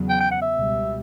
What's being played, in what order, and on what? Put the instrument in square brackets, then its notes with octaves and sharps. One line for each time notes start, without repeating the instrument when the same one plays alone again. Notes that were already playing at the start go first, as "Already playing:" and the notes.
Already playing: [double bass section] E2 C#3 F#3 B3
[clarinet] G5
G5
F#5
E5
[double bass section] C#2 B2 G3